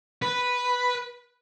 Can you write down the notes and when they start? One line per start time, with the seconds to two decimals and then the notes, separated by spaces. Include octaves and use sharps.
0.22 B4